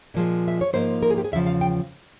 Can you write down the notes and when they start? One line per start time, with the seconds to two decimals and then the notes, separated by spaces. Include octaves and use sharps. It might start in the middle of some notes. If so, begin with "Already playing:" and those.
0.14 A#2 F3 G#3
0.48 E5
0.61 C#5
0.73 G#2 F3 A#3 C5
1.03 A#4
1.10 G#4
1.17 G4
1.24 G#4
1.32 E2 C#3 F3 E5
1.47 F5
1.61 G5